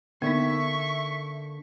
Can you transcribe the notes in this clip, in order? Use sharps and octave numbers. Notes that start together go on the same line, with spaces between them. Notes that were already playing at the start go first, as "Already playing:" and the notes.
D3 A#3 B3 D#4 E5 C#6